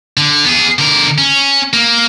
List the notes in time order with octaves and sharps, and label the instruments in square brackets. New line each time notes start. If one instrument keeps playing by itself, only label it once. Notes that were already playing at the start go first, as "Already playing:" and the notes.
[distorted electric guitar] D3
B3 G#4
D3 A#4
C#4
A#3